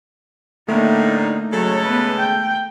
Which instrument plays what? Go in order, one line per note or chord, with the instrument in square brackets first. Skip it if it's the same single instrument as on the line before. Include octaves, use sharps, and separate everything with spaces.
[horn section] A2 D3 [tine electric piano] A3 [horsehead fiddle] A#3 D#4
[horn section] C#3 G#3 A4 [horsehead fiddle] F#3 C#5
[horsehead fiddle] B3 B4
G5